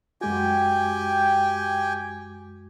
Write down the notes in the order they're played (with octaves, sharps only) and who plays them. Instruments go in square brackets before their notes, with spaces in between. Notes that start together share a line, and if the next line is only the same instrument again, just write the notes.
[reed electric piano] F#2 G#3 F#4 [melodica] G4 G5 G#5